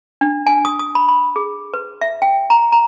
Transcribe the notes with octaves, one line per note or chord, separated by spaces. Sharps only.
D4
G#5
D#6
D#6
B5
B5
G#4
B4
E5
G5
A#5
A#5